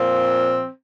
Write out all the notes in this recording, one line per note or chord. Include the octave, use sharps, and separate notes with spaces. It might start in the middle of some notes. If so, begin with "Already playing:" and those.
Already playing: A#2 F3 C4